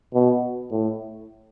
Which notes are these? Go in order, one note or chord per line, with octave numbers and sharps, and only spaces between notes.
B2
A2